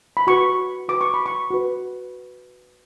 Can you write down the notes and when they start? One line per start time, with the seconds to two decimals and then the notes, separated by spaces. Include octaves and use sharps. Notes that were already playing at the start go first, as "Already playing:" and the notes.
0.17 B5
0.27 F#4 B4 C#6
0.88 F#4 B4 D6
1.01 C#6
1.14 B5
1.26 C#6
1.50 F#4 B4